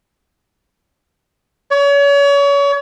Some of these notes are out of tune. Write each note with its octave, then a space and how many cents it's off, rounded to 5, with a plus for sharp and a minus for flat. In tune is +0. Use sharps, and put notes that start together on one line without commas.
C#5 +35